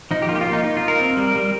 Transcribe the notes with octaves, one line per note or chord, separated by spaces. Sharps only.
F3 D#4
G4
A#3 F4
G4
F4
A#3
D#4
D#4
F4
D#4
A#4
C4
G3
G3